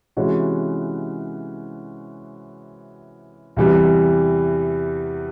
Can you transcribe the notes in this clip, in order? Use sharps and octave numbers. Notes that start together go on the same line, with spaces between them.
C3 E3 G#3 C#4 F#4
E2 C3 E3 G3